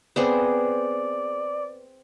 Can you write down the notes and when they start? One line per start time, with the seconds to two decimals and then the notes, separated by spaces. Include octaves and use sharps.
0.16 B3 C4 G#4 D5